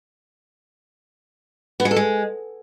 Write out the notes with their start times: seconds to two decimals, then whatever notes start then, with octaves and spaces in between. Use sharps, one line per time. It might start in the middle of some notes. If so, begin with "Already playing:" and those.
1.80 B3
1.85 G#3
1.91 A4
1.96 G#3